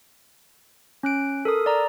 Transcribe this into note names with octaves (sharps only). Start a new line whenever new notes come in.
C#4 F#6 D7
A4 A#4 D#6
D5 A#5